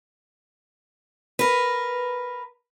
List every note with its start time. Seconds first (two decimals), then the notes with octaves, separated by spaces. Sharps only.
1.39 A#4 B4